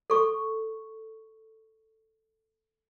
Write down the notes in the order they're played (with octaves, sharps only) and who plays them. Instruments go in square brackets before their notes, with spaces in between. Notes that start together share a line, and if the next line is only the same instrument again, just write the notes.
[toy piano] A4 C#6